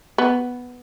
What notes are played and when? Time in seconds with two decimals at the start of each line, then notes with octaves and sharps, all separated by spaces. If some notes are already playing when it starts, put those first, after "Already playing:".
0.18 B3